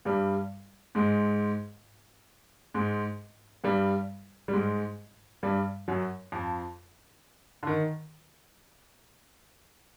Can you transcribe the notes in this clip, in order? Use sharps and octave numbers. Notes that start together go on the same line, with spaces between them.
G2 G3
G#2 G#3
G#2 G#3
G2 G3
G3
G#2 G#3
G2 G3
F#2 F#3
F2 F3
D3
D#3